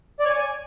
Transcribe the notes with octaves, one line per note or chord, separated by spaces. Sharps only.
D5
C#5
G#5